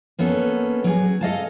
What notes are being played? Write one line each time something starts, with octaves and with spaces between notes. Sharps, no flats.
A#3 B3 C#4 A4
F#3 G#4
A4 D#5 F5 A5